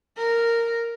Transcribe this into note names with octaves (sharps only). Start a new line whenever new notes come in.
A#4